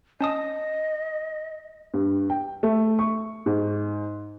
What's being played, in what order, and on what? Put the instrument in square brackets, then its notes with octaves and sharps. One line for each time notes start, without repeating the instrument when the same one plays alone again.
[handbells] C#4 A5 D#6 [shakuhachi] D#5
[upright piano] G2
G5
A3
C#6
G#2